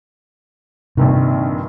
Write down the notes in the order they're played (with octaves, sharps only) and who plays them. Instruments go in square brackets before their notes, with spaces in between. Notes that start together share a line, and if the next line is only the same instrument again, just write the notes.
[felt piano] A#1 G2 D#3 [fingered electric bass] C3